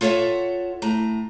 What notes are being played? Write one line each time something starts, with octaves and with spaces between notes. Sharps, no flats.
F4 A4 C#5 D5 E5 F#5
A2 A#5